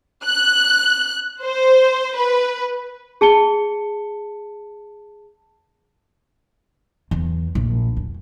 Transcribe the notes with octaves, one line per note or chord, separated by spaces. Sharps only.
F#6
C5
B4
G#4 A5 C#7 G7
E2
A#1
E2